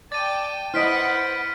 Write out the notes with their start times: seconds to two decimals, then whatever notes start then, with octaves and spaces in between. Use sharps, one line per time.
0.12 D5 G5 A5 A6 D#7
0.74 E4 B4 C5 D#5 F#5 F6 B6 D7